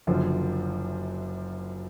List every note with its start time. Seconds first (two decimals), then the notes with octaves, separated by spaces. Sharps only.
0.07 F#1 F#2 D3 F3